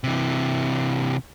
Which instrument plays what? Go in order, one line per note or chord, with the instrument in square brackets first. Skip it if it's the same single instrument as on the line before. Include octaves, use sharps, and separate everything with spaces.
[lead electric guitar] C3 E3